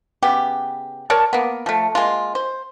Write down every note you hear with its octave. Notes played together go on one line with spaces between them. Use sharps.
C#3 B3 G4
A#4 C#5 D5 A5
A#3 B3
F3 A3
G#3 A#3 F4
C5